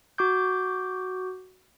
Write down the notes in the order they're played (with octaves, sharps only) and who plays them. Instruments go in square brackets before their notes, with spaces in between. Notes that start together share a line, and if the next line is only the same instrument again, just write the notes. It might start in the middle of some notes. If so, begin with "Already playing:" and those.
[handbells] F#4 D6 G6